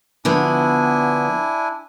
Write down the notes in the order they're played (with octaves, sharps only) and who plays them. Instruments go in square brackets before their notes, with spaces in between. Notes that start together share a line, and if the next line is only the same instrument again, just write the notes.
[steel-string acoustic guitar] D3 F3 B3 [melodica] D4 E4 G#5